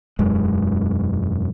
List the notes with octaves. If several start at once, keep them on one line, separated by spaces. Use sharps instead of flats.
E1 F#2 G#3